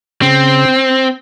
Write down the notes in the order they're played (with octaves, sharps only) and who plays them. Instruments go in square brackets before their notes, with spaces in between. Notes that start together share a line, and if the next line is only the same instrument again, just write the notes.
[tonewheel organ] C#3 [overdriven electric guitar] C4